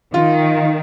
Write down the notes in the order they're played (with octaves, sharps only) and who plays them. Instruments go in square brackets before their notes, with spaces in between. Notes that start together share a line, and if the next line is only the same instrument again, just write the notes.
[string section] D#3 [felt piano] F4